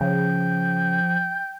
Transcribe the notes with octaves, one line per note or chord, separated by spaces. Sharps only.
C#3 F3 G5